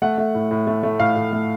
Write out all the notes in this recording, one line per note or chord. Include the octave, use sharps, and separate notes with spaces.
A3 F#5
A3
A2
A2
A3
A3
A2 F5
A2
A3